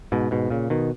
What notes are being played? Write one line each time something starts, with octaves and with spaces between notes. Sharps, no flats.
G#2 B2
G#2 B2
A#2 C#3
B2 D#3